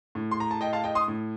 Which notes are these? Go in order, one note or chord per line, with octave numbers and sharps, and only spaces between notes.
A2
C6
A#5
A5
D#5 G5
F5 A5
D#5 G5
C6 D#6
A2